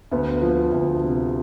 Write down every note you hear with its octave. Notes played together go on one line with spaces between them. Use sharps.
D2 B3
F3
D2
C3